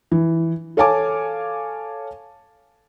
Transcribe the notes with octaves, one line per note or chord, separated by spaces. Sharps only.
E3
A4 C#5 F5 G#5 A5 D6